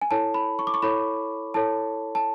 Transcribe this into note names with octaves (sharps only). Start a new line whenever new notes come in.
G#5
E4 A4 C#5 A5
B5
C#6
D6
C#6
E4 A4 C#5 B5
E4 A4 C#5 A5
A5